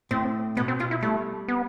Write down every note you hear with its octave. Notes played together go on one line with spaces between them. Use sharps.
A2 C4
B2 B3
C4
B2 F4
E4
G3 A3
B3